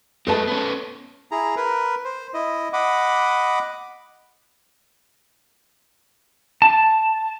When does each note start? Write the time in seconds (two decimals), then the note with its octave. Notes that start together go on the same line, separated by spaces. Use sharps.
0.27 G#3 A3 A4 B4 A5
0.47 B3 C#4
1.31 E4 G#4 A#5
1.56 A#4 B4
2.05 C5
2.34 E4 D#5
2.73 D#5 F#5 B5 D6
6.62 A5